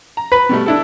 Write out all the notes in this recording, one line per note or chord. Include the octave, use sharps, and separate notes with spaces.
A#5
B4
B2 G3 A3
D4 E4 A4